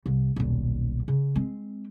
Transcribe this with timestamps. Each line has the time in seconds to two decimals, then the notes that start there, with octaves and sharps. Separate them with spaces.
0.06 C2
0.36 D#1 B1
1.08 C#3
1.35 G#3 C4